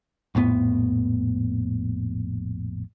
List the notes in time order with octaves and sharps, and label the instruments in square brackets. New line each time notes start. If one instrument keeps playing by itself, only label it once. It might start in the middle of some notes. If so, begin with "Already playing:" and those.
[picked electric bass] A#1 F2 A2 B3